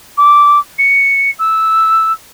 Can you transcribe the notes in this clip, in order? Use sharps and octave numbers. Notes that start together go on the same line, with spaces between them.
D6
C#7
E6